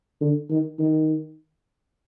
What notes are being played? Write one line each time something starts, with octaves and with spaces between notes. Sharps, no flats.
D3
D#3
D#3